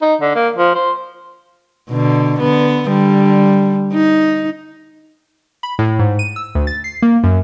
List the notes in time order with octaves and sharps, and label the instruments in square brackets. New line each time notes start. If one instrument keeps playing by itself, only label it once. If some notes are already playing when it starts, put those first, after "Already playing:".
[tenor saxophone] D#4
D3
A#3
F3
C5
[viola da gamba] B2 D3
D3 B3
D3 G3
D#4
[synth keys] B5
A2
G#2
D#7
E6
D2
A6
C7
A#3
F#2